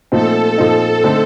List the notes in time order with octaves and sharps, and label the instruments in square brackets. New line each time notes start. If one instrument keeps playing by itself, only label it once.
[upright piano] A#2 F3 A3 C4 D#4 [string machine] A4
[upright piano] A#2 F3 C4 D#4
D3 A3 C4 D#4